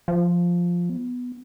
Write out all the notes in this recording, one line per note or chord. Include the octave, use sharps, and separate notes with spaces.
F3
B3